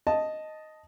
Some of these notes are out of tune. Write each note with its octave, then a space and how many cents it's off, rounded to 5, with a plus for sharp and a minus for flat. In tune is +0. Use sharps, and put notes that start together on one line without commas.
D#5 +0 A5 +0